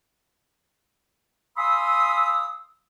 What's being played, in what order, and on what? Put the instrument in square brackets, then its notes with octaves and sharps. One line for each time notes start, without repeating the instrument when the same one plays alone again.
[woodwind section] F5 G#5 B5 C6 D#6 E6